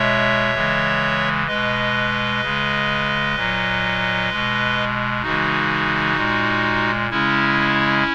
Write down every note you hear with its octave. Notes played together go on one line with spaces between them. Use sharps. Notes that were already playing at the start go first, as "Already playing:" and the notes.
Already playing: B2 G#3 C#5 E5
C#3 E3 G#3
B2 G#3 B4 D#5
C#3 G#3
A#2 F#3
B2 G#3
C#3 E3 G#3 D#4 F#4
A#2 G#3
C#3 G#3 C#4 E4